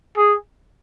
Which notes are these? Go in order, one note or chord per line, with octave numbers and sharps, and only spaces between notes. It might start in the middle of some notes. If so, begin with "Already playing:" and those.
G#4